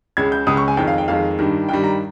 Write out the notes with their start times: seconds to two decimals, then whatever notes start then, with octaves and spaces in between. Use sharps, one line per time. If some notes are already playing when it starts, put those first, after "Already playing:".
0.17 C#2 C#3 G#3 G#6
0.32 G6
0.47 C#2 C#3 G#3 D#6
0.57 C#6
0.68 G#5
0.77 F2 D#3 G#3 G5
0.87 F5
0.98 G5
1.08 F2 D#3 G#3 F5
1.38 G2 D#3 G3
1.69 G2 D#3 G3 G5
1.84 A#5